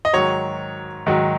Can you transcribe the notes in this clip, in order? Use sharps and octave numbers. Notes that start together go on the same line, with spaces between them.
D#5
G#2 D#3 F#3 C#5
G#2 D#3 F#3